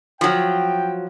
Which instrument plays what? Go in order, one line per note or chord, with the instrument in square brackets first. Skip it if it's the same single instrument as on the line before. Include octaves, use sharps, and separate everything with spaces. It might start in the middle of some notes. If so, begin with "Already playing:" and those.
[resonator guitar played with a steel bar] F3 F#3 [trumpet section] G5